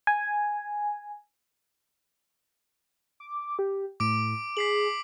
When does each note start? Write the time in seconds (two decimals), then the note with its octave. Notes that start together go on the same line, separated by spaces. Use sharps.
0.07 G#5
3.20 D6
3.59 G4
4.00 A2 D6 D7
4.57 G#4 B6 C7 F#7